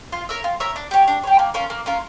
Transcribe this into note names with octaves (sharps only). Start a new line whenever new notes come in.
F4
A#4 C#5 E5
F4
A#4 C#5 E5
D4
G4 C#5
D4
G4 C#5
A#3
C#4 F4 A#4
A#3
C#4 F4 A#4